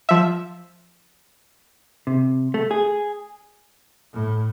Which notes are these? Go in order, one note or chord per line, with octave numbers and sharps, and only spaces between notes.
F3 E5
C3
A3
G#4
A2